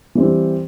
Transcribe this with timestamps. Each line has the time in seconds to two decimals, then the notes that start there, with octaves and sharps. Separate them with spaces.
0.15 E3 G3 C4